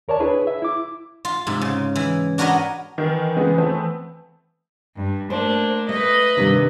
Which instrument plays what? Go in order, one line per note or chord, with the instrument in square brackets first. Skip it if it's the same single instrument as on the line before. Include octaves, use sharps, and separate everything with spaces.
[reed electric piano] D#2 A#4 C#5 D5 A5
D4 E4 G#4 B4 C#5
E5
E4 D6
[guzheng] F4
G#2 C3
C#3
E3
D4 F#4 A#4 B4 C#5 D#5
[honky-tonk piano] D#3 A#4 [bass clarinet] E3
[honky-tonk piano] C#3 G#3 B3 [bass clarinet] E3
[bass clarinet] E3 [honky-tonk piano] A3 B3 C4
[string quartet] G2
[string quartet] A3 A#3 D4 [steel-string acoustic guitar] C5
[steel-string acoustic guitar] A3 [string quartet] B4 D#5
[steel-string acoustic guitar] G2 C3 D#3